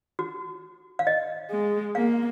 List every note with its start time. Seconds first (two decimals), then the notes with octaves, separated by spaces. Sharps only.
0.19 F#4
0.99 F5
1.07 D#5
1.51 G#3
1.95 A#3 F5